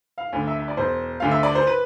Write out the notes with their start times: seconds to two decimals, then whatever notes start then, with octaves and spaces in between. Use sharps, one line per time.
0.18 F5
0.32 D2 D3
0.47 E5
0.59 E5
0.68 D5
0.77 E1 C5
1.20 D2 D3 F5
1.31 E5
1.43 D5
1.55 C5
1.67 B4